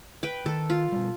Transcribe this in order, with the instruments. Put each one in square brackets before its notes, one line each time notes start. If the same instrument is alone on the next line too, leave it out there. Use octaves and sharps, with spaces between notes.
[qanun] B4 G5
[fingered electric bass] D#3 [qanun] A4
[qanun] F4
[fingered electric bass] B2 G3